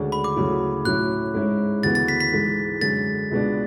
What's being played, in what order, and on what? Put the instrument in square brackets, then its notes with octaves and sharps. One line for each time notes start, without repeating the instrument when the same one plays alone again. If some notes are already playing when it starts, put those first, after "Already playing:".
Already playing: [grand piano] D2 C#3 G#3 D4
[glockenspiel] B5
D6
[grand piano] D2 C#3 F#3 A3 E4
[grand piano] A2 F#3 C#4 E4 [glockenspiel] F#6
[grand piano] G#2 G#3 C#4 E4
[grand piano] D2 C#3 E3 B3 [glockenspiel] A6
[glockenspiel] A6
B6
B6
[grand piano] G#2 E3 G#3
[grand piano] F#2 D3 G#3 [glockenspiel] A6
[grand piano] C#2 B2 G#3 B3 D4